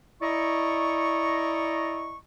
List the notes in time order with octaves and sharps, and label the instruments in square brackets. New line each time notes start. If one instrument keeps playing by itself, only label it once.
[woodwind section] E4 D5 D#5 A#5 C#6